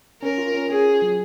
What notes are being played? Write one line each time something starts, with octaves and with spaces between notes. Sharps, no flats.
C#4 A#4
F4
C#4
C#4 G#4
F4
F#3